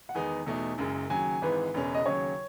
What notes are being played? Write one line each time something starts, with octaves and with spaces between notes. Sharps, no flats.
F#5
E2 D#3 G#3 B3 D#4 G#5
E2 B2 A3 D#4
F#1 F#2 C#3 G#3
D#2 C#3 F#3 G#5
G#1 G#2 E3 B4
E1 E2 C#3 G#3 C#4
D#5
D#2 C#3 F#3 C#4 C#5